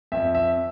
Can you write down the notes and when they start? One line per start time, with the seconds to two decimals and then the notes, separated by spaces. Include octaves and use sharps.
0.12 F2 E5
0.35 E5